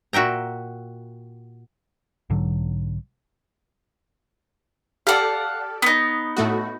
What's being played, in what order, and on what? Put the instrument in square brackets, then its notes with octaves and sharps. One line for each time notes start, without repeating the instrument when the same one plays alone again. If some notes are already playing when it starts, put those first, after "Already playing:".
[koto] A#2 F#4 E5 G5 A#5
[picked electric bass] B1 G#2 D3 F#3
[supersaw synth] G4 A4 D5 [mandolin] F5 F#5 [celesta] A5 F6
[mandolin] B3 D#4 [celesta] D#6
[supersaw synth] A2 A3 F#4